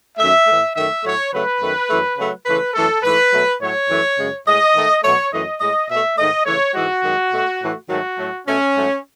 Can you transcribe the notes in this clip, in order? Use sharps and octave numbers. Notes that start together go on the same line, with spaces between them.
F#2 D#3 A3 E5
A2 E3 A3
F#2 D#3 A3 E5
A2 F#3 A3 C#5
C#3 F#3 A3 B4
F#2 D#3 A3
F#2 E3 A3
C#3 F#3 A3
C#3 E3 A3 B4
F#2 E3 A3 A4
G#2 E3 A3 B4
B2 F#3 A3
A2 F#3 A3 C#5
F#2 E3 A3
F#2 C#3 G#3
A2 G#3 D#5
G#2 D#3 A3
B2 F#3 A3 C#5
F#2 E3 A3 D#5
A2 G#3 D#5
B2 A3 E5
G#2 D#3 A3 D#5
C#3 E3 A3 C#5
G#2 E3 G#3 F#4
F#2 D#3 G#3
B2 A3
A2 E3 A3
G#2 D#3 F#3 A3 F#4
A2 F#3 A3
B2 A3 C#4
G#2 F#3 A3